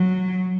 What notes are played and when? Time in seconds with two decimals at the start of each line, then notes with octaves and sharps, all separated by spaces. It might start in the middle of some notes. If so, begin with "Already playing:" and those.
Already playing: F#3